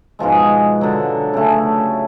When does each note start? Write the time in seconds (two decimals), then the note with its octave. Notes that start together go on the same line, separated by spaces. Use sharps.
0.19 G#2 B2 F3 G#3
0.81 D3 F#3
1.34 C#3 A3